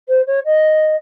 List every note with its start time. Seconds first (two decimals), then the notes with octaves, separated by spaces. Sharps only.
0.09 C5
0.27 C#5
0.45 D#5